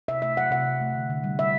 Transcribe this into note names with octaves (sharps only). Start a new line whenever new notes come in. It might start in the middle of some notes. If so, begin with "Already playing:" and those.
C3 E5
A3 E5
F#3 F#5
C3 F#5
C3
A3
D3
D3
G3
G3 E5